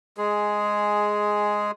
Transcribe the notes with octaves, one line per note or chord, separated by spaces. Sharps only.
G#3 G#4